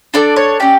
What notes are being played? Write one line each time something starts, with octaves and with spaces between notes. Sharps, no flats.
D4 A4 D5
C#5
C#4 G4 D5